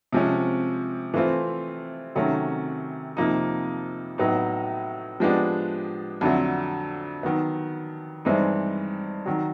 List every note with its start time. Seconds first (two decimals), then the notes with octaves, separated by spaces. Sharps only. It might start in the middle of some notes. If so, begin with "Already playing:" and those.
0.12 C3 F3 G#3 C#4
1.14 E3 A3 C4 F4
2.15 C3 D#3 F#3 A3 C#4
3.17 F2 C3 F3 A#3 D#4
4.18 A2 F#3 B3 D#4
5.20 F3 G#3 B3 D4 G4
6.21 F2 D3 F#3 A3
7.23 D#3 F#3 B3
8.25 G2 E3 G#3 C4 D#4
9.26 D#3 F#3